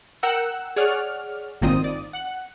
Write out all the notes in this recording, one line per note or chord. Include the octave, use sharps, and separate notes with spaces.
A#4 F#5 G5 E6
G#4 C#5 D5 F#5 F6
G#1 A#2 D#3 C4 F4 D#6
D5
F#5